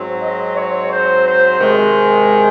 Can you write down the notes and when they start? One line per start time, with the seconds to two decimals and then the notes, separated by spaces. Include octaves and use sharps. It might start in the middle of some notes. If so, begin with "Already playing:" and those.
Already playing: G#2 F#3 C4
0.20 D#5
0.54 C#5
0.90 C5
1.24 C5
1.60 C3 D#3 G#3